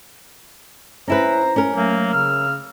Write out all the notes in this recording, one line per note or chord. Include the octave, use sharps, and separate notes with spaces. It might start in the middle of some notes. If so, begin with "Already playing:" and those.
C#4 E4 B4 C5 A#5
C#4 A#4
F#3 A3 A#3
C#3 E6 F6